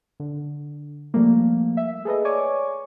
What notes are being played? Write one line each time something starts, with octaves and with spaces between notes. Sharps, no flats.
D3
F3 G3 A3 A#3
E5
G#4 A4 B4 D#5
C#5 D5 G#5 C#6 D6